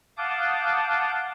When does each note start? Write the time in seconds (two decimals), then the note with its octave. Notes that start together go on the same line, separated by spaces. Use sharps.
0.18 F5 F#5 A5 D6 D#6 G6